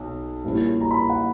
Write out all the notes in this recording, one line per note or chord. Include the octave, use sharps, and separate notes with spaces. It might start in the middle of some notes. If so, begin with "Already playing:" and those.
Already playing: B1
A#1 A#2 G3 C#4 E4
A#5
B5
F#5